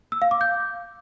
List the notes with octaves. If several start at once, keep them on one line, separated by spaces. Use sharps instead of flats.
E6
F5
D6
G6